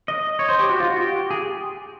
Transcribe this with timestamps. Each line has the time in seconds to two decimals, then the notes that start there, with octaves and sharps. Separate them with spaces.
0.08 D#5
0.39 C#5
0.49 C5
0.59 G4
0.69 F#4
0.80 F4
0.90 F#4
1.00 G4
1.30 G#4